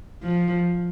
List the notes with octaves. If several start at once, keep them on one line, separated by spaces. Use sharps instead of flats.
F3